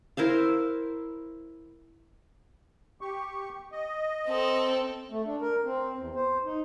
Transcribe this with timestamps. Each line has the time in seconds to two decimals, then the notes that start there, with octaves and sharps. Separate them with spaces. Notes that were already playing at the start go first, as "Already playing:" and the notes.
0.17 E4 A#4 C5 F5
3.01 G4 C#6
3.72 D#5
4.27 C4 A4
5.11 A3
5.26 D4
5.41 A#4
5.65 C4
5.97 E2
6.15 C5
6.45 D#4